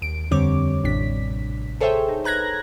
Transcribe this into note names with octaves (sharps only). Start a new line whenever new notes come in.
D#2 D7
F2 D3 G3 C4 C#5 D6
A1 A2 C3 D4 B6
G#4 A4 C5 C#5 E5 G5
D#4
B4 A#5 F#6 G#6 A#6